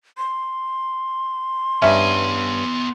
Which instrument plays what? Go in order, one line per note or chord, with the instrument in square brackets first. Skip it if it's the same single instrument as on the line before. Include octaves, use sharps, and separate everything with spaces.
[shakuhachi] C6
[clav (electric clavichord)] G2 C#4 [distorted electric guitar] B3 G#5 [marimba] E5